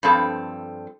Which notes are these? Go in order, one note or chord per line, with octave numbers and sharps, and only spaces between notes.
G2 F3 C4 A4